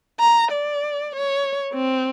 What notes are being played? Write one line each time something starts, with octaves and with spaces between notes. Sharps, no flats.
A#5
D5
C#5
C4